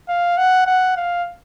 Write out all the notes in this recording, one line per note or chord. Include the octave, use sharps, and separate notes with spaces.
F5
F#5
F#5
F5